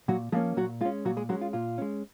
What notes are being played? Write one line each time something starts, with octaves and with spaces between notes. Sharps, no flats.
A#2 F#3 F#4
F3 G#3 A#3 C#4 G#4
A#2 F#3 F#4
G#3 C#4 F4
A#2 F#3 F#4
G#3 G#4
F#3 G#3 C#4 F#4
F4
A#2 F4
G#3 C#4